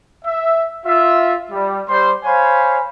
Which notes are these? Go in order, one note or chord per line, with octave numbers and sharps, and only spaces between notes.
E5
F4 E5
G3
G3 C5
C5 C#5 F5 G#5 B5